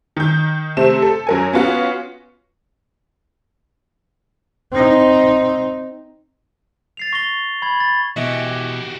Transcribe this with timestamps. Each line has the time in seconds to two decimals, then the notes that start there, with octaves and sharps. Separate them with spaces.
0.17 D#3 G6
0.77 C3 A3 C4 E7
1.02 A4
1.27 F#2 A#4 G#5
1.53 B3 C#4 F4 F#4
4.72 C4 D#4
6.97 A6 C7 F7
7.13 C#6 A#6 G7
7.62 B5 G#6
7.80 A6
8.16 B2 E3 F#4 G4 D#5 E5